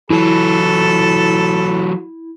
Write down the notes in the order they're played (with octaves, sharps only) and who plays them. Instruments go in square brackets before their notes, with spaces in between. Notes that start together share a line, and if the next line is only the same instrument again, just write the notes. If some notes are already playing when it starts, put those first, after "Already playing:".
[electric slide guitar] E3 F#3 [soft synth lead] E4 [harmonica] A4 B5